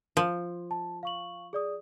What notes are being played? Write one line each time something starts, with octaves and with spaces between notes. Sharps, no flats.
F3
A5
F5 C#6 F#7
G#4 D5 D#6